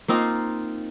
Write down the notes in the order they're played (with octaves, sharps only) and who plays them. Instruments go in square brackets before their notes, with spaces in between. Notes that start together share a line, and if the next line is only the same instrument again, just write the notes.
[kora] A#3 C4 D#4 F4